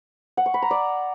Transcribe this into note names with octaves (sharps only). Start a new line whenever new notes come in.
F#5
C#6
B5
A#5
D5